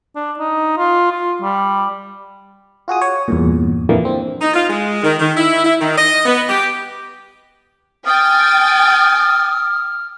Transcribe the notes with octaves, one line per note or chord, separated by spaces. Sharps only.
D4
D#4
F4
F4
G3
F4 F#4 G#4 D#6
C#5
E2 G2 A#2
F2 A#2 D3 E3 A#3
C4
D#4
F4
G#3
D#3
D#3
E4
E4
D#3
D#5
B3
G4
G5 G#5 D#6 F6 A6